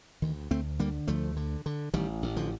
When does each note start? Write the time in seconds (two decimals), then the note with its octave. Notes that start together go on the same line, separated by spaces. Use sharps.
0.22 D2 D#3
0.51 D2 A3 C4
0.79 D3 G3 A#3
1.07 D2 F3 A3
1.36 D3
1.66 D3
1.94 A1 D#3 G3
2.23 A1
2.36 D3 F3